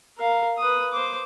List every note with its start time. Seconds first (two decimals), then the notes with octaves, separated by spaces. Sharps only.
0.18 A#4 F5
0.58 B4 D#6
0.92 C5 D6